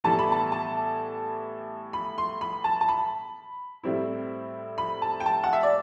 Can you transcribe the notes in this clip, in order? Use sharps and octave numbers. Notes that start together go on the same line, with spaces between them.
A2 E3 G3 B3 E4 A5
B5
A5
A5
B5
C6
B5
A5
A5
B5
A2 G3 C4 E4
B5
A5
G5
A5
F#5
E5
D5